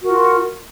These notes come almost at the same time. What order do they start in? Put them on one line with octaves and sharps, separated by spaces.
F#4 A#4 F4